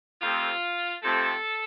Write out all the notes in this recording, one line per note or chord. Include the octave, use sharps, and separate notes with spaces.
F2 C3 F3 A3 C4 F4
F2 C3 F3 A3 C4 A4